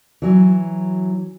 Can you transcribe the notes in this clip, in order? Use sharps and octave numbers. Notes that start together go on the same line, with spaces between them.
E3 F#3